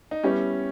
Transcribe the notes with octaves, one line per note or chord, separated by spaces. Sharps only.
D#4
G3 B3 C#4 E4 G4 C#5